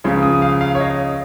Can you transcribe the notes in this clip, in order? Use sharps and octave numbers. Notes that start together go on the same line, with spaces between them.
C#2 C#3 F3
D#6
F5
F5
C#5
D#5